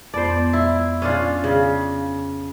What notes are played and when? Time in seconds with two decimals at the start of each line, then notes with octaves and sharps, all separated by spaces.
0.14 F2 B3 C5 D5
0.53 E4
1.02 C#4 D4 F4
1.44 C#3